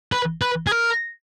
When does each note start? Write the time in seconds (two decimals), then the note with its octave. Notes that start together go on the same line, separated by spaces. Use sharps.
0.12 B4
0.42 B4
0.67 G#4
0.71 A#4